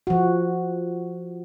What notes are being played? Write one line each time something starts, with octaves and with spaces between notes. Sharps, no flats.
F3 F#4